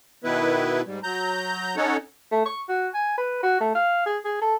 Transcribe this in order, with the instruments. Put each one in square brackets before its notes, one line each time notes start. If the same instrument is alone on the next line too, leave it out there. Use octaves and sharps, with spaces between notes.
[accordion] B2 D#3 B3 E4 B4
G#2 G3
F#3 A#5 G6
C#4 D#4 A4 C#5 F#5
[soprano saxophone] A3
C#6
F#4
G#5
B4
F#4
A3
F5
G#4
G#4
A4